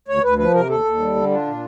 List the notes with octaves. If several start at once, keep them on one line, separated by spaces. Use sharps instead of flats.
D2 C#5
D2 B4
F3 B4
C3 A#4
D#2 A4
D#2
G3
D3
D4 F4
A#2